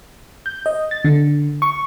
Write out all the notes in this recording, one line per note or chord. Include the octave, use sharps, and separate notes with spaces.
G6
D#5
A6
D3
C#6